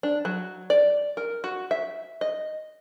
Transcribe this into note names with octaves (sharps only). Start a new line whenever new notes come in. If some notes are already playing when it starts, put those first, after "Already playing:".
D4
F#3
D5
A#4
F#4
E5
D#5